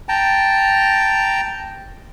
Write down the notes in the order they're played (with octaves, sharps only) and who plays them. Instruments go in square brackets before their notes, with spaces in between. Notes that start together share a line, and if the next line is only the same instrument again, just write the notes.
[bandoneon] G5 A5 A#5